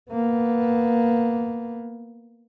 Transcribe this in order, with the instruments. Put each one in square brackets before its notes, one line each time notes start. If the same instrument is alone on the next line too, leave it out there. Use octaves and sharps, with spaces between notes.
[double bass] A#3 B3